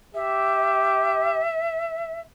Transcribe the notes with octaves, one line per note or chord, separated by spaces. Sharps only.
G4 E5